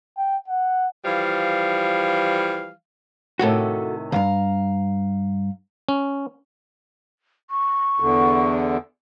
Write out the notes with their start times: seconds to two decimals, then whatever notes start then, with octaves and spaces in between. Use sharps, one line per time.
0.17 G5
0.48 F#5
1.05 E3 F3 G3 F5
3.39 A2 C3 D#3 F#4 A4
4.12 C#2 G2 F5 A#5
5.89 C#4
7.50 C#6
8.00 E2 D3